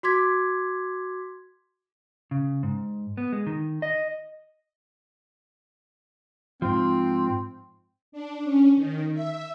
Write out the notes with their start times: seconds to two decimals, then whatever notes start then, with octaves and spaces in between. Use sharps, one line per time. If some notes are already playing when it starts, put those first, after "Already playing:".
0.03 F#4 C6 D6 G#6 B6
2.31 C#3
2.63 G#2
3.17 B3
3.32 G#3
3.47 D#3
3.82 D#5
6.62 G#2 F3 C4
8.12 D4
8.44 C#4
8.77 D#3
9.14 E5